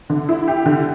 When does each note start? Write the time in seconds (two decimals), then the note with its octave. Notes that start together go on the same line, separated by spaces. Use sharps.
0.10 D3
0.29 E4
0.48 G4
0.66 D3